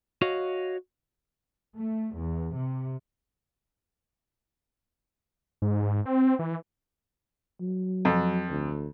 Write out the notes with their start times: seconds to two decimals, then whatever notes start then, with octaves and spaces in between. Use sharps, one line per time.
0.22 F#4 C#5 D#5 F5
1.77 A3
2.16 E2
2.56 C3
5.62 G#2
5.82 G#2
6.06 C4
6.39 E3
7.61 F#3
8.05 F2
8.50 D2